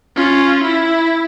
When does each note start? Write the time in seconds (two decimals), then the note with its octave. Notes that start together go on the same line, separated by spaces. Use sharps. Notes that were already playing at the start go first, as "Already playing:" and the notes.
0.16 C#4 F4
0.64 E4